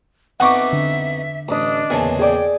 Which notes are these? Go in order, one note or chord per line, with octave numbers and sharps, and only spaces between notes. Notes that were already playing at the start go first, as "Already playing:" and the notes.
F2 B3 D#4 E5 F#5 C#6 D6
D3
A1 D4 D#5 D6
E2 A#2 C#3 G#5 A5
G#4 D5 G5